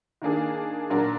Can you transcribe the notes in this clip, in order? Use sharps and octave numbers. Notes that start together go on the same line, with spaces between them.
D#3 A#3 D4 G#4
A#2 F#3 D4 F#4 A#4